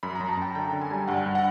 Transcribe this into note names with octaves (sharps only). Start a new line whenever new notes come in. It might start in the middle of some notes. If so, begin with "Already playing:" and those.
F#2 B5
A#5
F#2
A5
F#2 G5
D3 G5
D3
G#5
G3
G2 F#5
G2
F#5